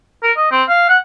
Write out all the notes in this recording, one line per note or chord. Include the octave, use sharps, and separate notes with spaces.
A#4
D#5
C4
F5
F#5